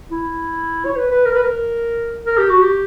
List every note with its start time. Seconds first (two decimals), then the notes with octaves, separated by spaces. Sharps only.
0.10 E4
0.85 C#5
0.96 B4
1.11 B4
1.25 A#4
1.34 B4
1.43 A#4
2.25 A#4
2.38 G4
2.50 F#4
2.62 G4